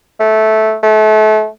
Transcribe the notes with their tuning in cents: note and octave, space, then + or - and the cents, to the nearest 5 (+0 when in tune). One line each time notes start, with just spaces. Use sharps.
A3 -10
A3 -35